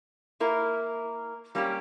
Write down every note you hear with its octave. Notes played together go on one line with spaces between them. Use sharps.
A#3 E4 A#4
G3 A#3 C#4 G4